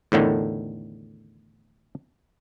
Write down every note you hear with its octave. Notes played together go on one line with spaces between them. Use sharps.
E2 A2 D3 D#3